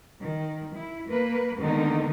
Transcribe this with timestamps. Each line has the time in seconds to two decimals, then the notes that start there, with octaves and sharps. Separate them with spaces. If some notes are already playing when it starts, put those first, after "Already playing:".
0.22 D#3
0.76 E4
1.10 A#3 B4
1.61 D3 D#3 G#3 A#3 B3 D#4